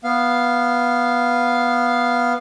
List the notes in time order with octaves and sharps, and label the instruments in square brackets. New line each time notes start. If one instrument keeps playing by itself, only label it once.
[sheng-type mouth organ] B3 F5